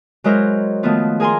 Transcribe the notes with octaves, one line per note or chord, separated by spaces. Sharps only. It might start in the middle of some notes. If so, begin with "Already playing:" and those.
F#3 G#3 E4 A#4 C5
D#3 F3 A3 B3 F4
G#4 A#4 G#5 A#5 C6